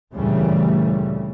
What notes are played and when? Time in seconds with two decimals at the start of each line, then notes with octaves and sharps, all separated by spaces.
0.14 D2 A#2 C#3 E3 G3 A3